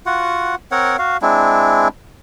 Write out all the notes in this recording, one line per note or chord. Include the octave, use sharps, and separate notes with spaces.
F4 F#4 F#5
C4 A#4 C#5 F#5
F#4 F5
G#3 C4 D4 E4